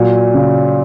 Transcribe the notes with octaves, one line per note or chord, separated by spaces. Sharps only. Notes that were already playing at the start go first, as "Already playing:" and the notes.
Already playing: A#2 F#3
C#3